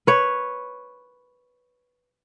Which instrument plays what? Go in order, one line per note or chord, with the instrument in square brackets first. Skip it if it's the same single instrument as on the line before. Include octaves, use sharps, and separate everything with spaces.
[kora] B4 C#5